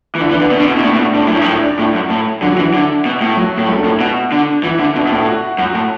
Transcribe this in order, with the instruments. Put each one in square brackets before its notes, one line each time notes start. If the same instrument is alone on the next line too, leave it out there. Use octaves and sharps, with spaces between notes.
[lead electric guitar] E3
[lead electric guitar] D3 [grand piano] E4 E5
[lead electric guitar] E3 [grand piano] D4 D5
[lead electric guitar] D3 [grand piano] B3 B4
[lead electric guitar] B2
D3
[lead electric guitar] B2 [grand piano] E4
[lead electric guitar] B2
[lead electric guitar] A2 [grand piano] D4
[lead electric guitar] B2
A2
[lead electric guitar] A2 [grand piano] D4
[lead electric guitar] F#2 [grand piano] E4
[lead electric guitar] A2 [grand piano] D4
[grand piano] E4
D4
[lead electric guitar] A2 [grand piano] E4
[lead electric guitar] F#2
A2
[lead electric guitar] D3 [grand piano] F#3 F#4
[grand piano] F#3 F#4
[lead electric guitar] E3
[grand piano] E4
[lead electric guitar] D3
B2
A2
[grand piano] F#3 F#4
[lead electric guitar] A2
[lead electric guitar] F#2 [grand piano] A3 A4
[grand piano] D4 D5
[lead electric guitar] A2
[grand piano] E4 E5
[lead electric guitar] B2 [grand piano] F#4 F#5
[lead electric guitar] D3
[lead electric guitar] E3 [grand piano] E4 E5
[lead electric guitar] D3
[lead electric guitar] B2 [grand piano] D4 D5
[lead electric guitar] B2
[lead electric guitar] A2 [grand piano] E4 E5
[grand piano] F#4 F#5
[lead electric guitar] F#2 [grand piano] F#4 F#5
[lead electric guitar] A2